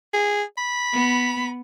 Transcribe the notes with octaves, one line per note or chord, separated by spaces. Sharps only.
G#4
B5
B3